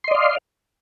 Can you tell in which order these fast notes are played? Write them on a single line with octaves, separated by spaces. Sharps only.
C6 D#5 D5 F5